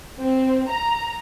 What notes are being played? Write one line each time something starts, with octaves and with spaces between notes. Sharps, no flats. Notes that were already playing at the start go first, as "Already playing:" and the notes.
C4
A#5